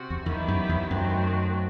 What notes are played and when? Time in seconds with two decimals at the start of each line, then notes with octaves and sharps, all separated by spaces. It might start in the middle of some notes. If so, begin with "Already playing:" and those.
Already playing: C3 F#4
0.10 E2
0.26 E2 D#3 F#3 B3 E4 G4
0.48 F#2
0.69 E2
0.90 F#2 D#3 F#3 A3 C4 F#4